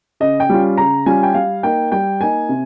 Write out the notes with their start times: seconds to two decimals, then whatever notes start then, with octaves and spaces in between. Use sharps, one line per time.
0.20 C#3 D#5
0.40 G5
0.50 G3 C#4 F4
0.78 C#3 A#5
1.06 G3 C#4 F4 G#5
1.23 G5
1.34 G3 F5
1.63 A#3 D#4 G5
1.92 G3 G5
2.20 A#3 D#4 G#5
2.49 C3